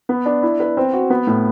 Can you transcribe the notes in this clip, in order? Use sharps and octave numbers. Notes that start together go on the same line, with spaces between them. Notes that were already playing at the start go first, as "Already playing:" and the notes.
B3
D4
E4
B4
C4
F#4
B3
A2